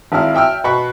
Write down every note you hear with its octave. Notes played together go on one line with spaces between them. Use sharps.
G#1 E4 F5 F6
E5 G5 E6 F6
B2 F#4 B5 C#6